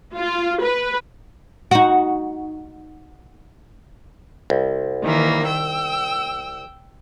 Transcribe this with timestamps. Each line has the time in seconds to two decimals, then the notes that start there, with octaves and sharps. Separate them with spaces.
0.16 F4
0.63 B4
1.71 D#4 F#4
4.50 C2
5.03 D#3 E3 A#3
5.47 G5 E6